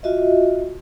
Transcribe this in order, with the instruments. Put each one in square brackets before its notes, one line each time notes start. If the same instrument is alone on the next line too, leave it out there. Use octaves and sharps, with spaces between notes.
[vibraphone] F4 F#4 D#5 E5